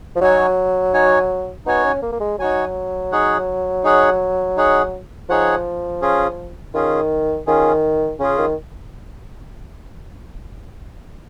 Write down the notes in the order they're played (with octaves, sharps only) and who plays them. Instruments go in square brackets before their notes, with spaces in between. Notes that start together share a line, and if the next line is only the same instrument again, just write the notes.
[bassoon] F3
[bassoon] F#3 [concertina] D#4 F#4 C#5 G#5
[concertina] D#4 F#4 C#5 G#5
[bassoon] B3 [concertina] D#4 F#4 C#5 G#5
[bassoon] C#4
A#3
A#3
G#3
[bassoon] F#3 [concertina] D#4 F#4 C#5 G#5
[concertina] D#4 G#4 C#5 F#5
D#4 G#4 C#5 F#5
D#4 G#4 C#5 F#5
[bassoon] F3 [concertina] D#4 G#4 C#5 F#5
[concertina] C#4 F4 G#4
[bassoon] D#3 [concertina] C#4 F4 G#4
[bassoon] D#3 [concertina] C#4 F4 G#4
[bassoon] C#3 [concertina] C#4 F4 G#4
[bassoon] D#3